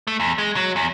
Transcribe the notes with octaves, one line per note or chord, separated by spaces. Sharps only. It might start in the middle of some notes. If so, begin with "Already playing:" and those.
A3
E2
G#3
F#3
E2